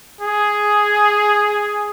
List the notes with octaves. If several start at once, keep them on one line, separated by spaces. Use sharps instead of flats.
G#4